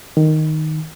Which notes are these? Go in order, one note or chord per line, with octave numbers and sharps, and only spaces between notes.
D#3